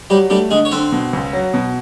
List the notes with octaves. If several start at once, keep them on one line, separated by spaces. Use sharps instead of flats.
F#3 G3 G4
G3 A3 G4
D3 G#3 G#4
C#5
D3 C4 C5
B2
C#2
F#3
B2